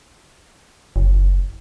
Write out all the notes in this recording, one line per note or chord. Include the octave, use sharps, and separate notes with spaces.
F#1